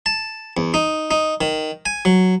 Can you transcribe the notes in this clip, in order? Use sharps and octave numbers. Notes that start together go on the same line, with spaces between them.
A5
E2
D#4
D#4
D#3
G#5
F#3